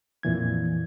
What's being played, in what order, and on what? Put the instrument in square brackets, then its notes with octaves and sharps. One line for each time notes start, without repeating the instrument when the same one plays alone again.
[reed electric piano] F2 A#2 E3 G#6